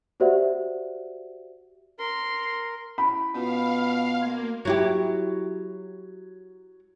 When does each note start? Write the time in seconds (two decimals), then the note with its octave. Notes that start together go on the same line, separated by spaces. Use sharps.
0.20 F#4 G4 C5 D5 E5 F#5
1.99 A#4 C6
2.98 C#4 E4 B5
3.34 B2 C#4 F4 B4 F5
4.21 A#3 C6 G#6
4.65 F#3 E4 G4